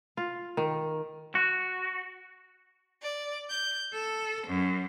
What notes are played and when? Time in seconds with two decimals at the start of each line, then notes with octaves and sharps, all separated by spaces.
0.17 F4
0.57 D#3
1.35 F#4
3.03 D5
3.50 G6
3.93 A4
4.46 F#2